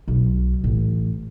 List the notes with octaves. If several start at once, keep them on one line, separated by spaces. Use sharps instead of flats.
B1
A1